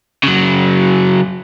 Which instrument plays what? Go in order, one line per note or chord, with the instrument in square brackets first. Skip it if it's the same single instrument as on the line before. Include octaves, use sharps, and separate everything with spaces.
[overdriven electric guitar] C#3 F#3